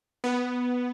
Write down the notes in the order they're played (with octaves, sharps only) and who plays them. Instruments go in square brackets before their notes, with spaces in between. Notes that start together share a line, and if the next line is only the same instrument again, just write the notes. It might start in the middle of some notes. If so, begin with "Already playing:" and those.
[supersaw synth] B3